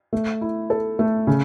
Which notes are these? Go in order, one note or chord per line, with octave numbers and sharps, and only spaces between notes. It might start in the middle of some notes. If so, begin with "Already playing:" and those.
A3
E4
A4
A3
C#3